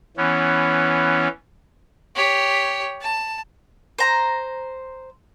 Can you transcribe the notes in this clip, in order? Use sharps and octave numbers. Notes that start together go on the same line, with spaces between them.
E3 B3 C#4
G4 C#5
A5
C5 A#5